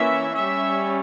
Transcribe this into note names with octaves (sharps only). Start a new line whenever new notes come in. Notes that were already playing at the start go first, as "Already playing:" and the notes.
Already playing: E3 A#3 C#4 E5
G3 C#4 E5